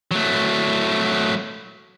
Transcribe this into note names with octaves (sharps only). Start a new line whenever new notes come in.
F#3 A3